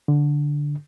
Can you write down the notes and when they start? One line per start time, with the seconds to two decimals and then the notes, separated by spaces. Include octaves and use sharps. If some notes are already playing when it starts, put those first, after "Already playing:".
0.08 D3